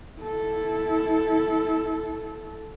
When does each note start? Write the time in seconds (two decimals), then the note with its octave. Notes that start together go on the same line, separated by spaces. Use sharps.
0.21 E4 A4